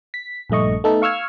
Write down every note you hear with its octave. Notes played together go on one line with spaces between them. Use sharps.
B6
A#1 G2 A3 D#5 C#6
A3 B3 D#4 A4
F5 C#6 E6 F6 G#6